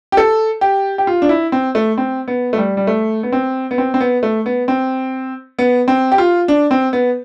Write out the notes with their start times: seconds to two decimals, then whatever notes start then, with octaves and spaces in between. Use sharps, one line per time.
0.12 G4
0.17 A4
0.61 G4
0.98 G4
1.07 F4
1.22 D4
1.29 E4
1.52 C4
1.75 A3
1.98 C4
2.28 B3
2.53 A3
2.58 G3
2.77 G3
2.87 A3
3.23 B3
3.32 C4
3.71 B3
3.78 C4
3.94 C4
4.00 B3
4.23 A3
4.46 B3
4.68 C4
5.59 B3
5.88 C4
6.12 G4
6.18 F4
6.48 D4
6.71 C4
6.93 B3